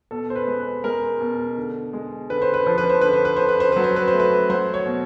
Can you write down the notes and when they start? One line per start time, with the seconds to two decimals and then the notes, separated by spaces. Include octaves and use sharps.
0.11 B2 A4
0.30 C5
0.36 B4
0.47 G#3
0.60 B4
0.84 G#3 A#4
1.21 B2
1.57 D3
1.93 G#3
2.30 D3 B4
2.42 C5
2.54 B4
2.66 F3 C5
2.78 B4
2.89 C5
3.01 D3 B4
3.13 C5
3.25 B4
3.37 D3 C5
3.49 B4
3.60 C5
3.72 F#3 B4
3.84 C5
3.96 B4
4.08 C5
4.13 A3
4.20 B4
4.50 F#3 C5
4.74 C#5
4.86 B2